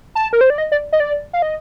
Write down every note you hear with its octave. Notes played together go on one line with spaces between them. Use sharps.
A5
A#4
C5
D5
D#5
D5
D#5
D5
F5
D#5